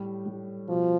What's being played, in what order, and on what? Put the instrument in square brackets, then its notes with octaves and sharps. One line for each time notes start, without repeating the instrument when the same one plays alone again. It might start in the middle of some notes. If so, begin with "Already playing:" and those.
Already playing: [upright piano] A2 G3
G3
[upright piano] B2 [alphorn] F3